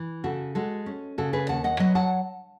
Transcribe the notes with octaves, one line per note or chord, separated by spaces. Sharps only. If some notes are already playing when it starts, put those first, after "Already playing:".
Already playing: E3
C#3 F#4 A4
G#3 F#4 A4
C#4
C#3 F#4 A4
G#4 B4
D#2 F#5 A5
D#5 F#5
F#3 B4 D#5
F#5 A5